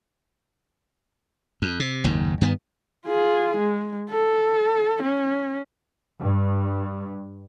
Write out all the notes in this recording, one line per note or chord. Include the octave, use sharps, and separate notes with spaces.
F2
C3
F#1 D#2 G#2
G2 D#3 B3
F4 G#4
G#3
A4
C#4
G2